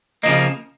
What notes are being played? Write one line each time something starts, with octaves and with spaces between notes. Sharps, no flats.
C#3 F3 A#3 D#5